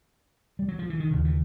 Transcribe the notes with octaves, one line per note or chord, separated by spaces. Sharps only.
G3
F#3
F3
E3
D#3
D#2 C#3
E3